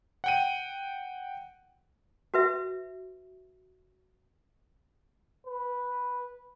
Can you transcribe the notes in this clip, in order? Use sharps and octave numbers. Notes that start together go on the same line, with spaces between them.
F#5 G5 D#7
F#4 B4 E5
B4